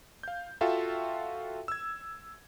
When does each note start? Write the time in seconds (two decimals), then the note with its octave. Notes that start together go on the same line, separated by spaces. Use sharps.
0.23 F5 G6
0.61 F4 F#4 A4 E5 F5 G5
1.68 E6 G#6